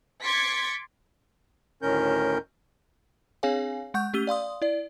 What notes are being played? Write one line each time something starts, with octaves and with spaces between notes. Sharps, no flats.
C6 D6 G#6 A6 B6 C#7
D2 A2 D#3 C#4 A#4 G6
C4 D4 G#4 C#5 F5 G#5
G#3 F#5 C#6 G6
A3 C#4 G4 E6 D#7 G7
D5 F5 C6 D#6
E4 D5